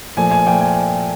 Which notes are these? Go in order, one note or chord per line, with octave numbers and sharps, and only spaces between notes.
A#2 F3 A3 G#5
G#5
A#2 F3 A3 G5
G#5